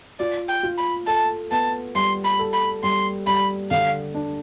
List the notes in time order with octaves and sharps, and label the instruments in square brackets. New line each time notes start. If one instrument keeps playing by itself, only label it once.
[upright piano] F4 [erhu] D5
[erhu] G5
[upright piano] F4
[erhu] B5
[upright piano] A4 [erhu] A5
[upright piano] B3 [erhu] A5
[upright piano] G3 [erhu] C6
[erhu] B5
[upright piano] A4
[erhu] B5
[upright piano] G3 [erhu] C6
[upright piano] G3 [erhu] B5
[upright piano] D3 [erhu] F5
[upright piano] D4